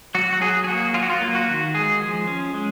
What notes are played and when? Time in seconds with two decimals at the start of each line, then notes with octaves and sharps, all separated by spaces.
0.15 F#3 F#4
0.33 F#4
0.41 F#3 G#4
0.64 G#4
0.68 A#3 F#4
0.94 F#3 F4
1.03 F#4
1.10 F4
1.21 A#3
1.35 F#4
1.48 D#3
1.74 G#3 G#4
2.01 F3
2.27 C#4
2.54 G#3